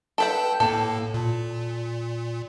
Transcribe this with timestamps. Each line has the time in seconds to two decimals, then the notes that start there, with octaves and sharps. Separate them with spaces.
0.18 A4 B4 F#5 G5 A5 G6
0.60 A2 A#3 A4
1.14 A#2